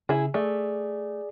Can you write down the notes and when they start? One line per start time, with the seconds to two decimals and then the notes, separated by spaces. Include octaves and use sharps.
0.09 C#3 E4 G#4
0.34 A3 G#4 D5